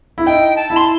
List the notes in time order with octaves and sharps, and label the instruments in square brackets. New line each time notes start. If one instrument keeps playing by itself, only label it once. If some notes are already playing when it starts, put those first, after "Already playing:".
[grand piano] E4
[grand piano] D#4 [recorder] G5
[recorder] A5
[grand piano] E4
[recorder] C6